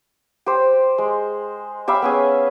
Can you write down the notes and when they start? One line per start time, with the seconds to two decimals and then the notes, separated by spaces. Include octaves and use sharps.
0.46 G4 C5
0.98 G#3
1.88 G4 E5 F5 B5
2.02 B3 C#4 G#4